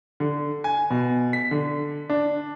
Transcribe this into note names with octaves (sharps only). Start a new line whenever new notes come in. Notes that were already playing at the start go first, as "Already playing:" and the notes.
D3
G#5
B2
B6
D3
D4